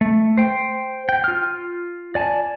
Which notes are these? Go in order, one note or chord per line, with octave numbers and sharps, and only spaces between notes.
A3
C5 G5
G5
F4 F6
D5 G#5 A5